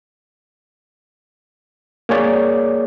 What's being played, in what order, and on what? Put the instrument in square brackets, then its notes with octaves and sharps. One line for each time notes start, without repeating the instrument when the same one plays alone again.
[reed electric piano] A#3 G#4 C#5 D5